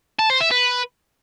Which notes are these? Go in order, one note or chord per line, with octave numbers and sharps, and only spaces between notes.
A5
C5
E5
B4